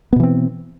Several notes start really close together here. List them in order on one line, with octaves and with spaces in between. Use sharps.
B3 B2 E3 C4